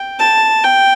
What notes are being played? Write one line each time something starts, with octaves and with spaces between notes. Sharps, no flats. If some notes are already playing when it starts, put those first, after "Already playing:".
Already playing: G5
A5
G5